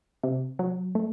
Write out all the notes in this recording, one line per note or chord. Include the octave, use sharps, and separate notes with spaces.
C3
F#3
A3